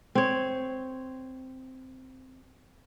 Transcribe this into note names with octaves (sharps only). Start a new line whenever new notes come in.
C4 C#5